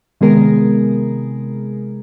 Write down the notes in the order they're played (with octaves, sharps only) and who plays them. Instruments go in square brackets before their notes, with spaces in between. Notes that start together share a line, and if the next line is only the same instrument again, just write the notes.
[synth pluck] C3 D#3 G#3 B3 G#4 A#4